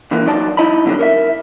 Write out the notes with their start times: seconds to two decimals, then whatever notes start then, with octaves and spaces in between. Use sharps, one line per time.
0.11 A#2 D3 E3 A#3
0.26 F#3 D#4 D5 A5
0.57 D#4 E4 D#5 A5 B5
0.85 F#2 B2 D3 D#3 G3
0.99 A#4 C#5 E5